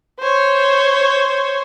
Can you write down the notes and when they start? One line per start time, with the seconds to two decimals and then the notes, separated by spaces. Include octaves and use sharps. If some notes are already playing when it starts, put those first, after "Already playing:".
0.20 C5 C#5